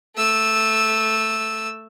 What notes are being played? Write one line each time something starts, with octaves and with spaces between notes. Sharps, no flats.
A3 E6